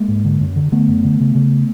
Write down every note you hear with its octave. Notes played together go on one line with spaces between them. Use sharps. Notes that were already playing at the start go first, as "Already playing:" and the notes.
Already playing: G#3 A#3
G#2
D3
F#2
D3
D3 A3 B3
F#2
D3
C#3
C#3